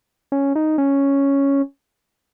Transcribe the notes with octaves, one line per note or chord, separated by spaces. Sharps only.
C#4
D#4
C#4